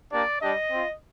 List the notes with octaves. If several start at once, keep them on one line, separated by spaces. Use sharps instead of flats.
A#3 D4 G4 D5
G3 D4 G4 D#5
C4 F4